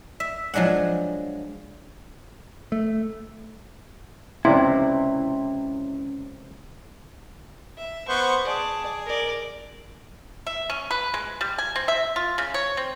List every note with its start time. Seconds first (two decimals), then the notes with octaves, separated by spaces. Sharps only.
0.20 E5
0.54 F3 F#3 G#3 D4 F#5
2.72 A3
4.45 C#2 C3 C#4 E4 D5 G5 C6
7.77 E5
8.08 B3 C5 C#6
8.44 G#4 D5 A5
9.06 A#4 D5
10.47 E5
10.70 C#4
10.91 B4
11.14 G#3
11.41 G3
11.58 G#5
11.76 C4
11.88 E5
12.16 F4
12.38 C#3
12.54 C#5
12.77 C4